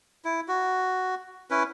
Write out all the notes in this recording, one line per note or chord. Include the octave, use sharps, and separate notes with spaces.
E4
F#4
C#4 E4 B4